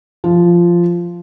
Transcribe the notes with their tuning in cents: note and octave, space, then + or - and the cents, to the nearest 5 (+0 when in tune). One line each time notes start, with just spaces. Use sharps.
F3 -10